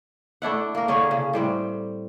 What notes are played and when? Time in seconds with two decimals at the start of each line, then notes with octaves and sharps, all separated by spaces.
0.42 A3 D4 E4 F#5
0.75 A#3 A#4
0.88 D3 C#4 G#4 C#5
1.11 C#3
1.33 A2 G3 C4